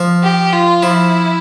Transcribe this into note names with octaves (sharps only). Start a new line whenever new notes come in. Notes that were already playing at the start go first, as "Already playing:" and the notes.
Already playing: F3
G4
F4
F3 E4